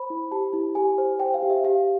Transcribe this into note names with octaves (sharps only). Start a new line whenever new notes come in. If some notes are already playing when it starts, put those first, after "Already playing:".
Already playing: C5 B5
E4
G4 A5
E4
G4 G#5
C5
C5 G5
F5
G4
E5
G4 F5